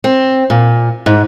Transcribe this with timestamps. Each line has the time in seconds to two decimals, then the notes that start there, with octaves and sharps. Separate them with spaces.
0.04 C4
0.50 A#2
1.06 G#2